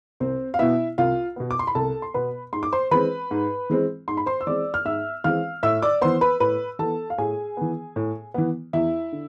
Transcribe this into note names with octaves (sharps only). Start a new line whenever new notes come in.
C2 C4 C5
F5
B2 B3 E4 E5
C2 F4 F5
B2 B3
D6
C6
B5
C2 A4 A5
C6
B2 B3 B4 B5
G#2 C6
D6
C5 C6
E3 G#3 C4 B4 B5
G#2
E3 G#3 C4
G#2 C6
B5
C5 C6
E6
E3 G#3 C4 D5 D6
F6
G#2 E5 E6
E3 G#3 C4 F5 F6
A2 E5 E6
D5 D6
E3 B3 C5 C6
B4 B5
A2 B4 B5
E3 B3 A4 A5
F5
A2 G#4 G#5
E3 B3
A2
E3 B3
E2 E4 E5
D3